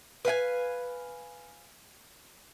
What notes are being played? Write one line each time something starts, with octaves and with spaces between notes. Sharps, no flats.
B4 F5 F#5 G#5